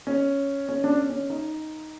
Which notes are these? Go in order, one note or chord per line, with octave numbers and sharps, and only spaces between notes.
C#4
C#4
D4
C#4
C#4
D#4